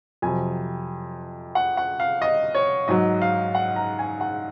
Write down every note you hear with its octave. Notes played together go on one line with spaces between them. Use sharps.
F2 C3 F#3 G#5
F#5
F#5
F5
D#5
C#5
G#2 F#3 D#5
F5
F#5
A#5
G#5
F#5